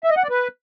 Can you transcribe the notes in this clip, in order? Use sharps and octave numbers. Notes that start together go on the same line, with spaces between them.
E5
D#5
F#5
D5
B4